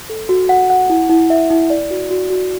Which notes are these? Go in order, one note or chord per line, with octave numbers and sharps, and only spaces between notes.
A4
F#4
F#5
F#5
E4
E4
E5
E4
D5
F#4
F#4
F#4